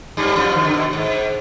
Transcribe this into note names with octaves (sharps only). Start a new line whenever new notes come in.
G2 G3
F2 F3
D#2 D#3
D3
B2
G#2